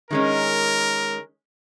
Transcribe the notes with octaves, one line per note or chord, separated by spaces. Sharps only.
D#3 G#3 C#4 A#4